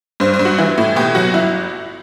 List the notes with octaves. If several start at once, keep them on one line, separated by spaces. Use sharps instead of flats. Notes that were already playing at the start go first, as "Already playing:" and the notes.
G2 C5
C5
G2
F#4
E3 E4
A2
B2 G4
F#3 F#4
G1 E4